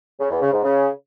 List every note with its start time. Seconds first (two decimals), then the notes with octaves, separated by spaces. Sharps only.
0.20 C#3
0.31 E2
0.41 C#3
0.52 G#2
0.63 C#3